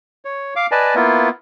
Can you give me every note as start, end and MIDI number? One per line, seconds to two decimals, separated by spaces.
0.25 0.54 73
0.56 0.67 77
0.56 0.67 86
0.71 0.95 71
0.71 0.95 74
0.71 0.95 75
0.71 0.95 80
0.71 0.95 81
0.95 1.29 58
0.95 1.29 59
0.95 1.29 64
0.95 1.29 65